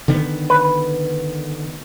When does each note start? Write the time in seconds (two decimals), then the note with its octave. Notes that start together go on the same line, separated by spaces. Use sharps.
0.08 D3 D#3 B3
0.50 B4